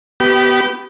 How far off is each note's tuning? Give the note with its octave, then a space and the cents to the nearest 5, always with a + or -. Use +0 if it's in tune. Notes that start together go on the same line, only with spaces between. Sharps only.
B3 +0 G4 -30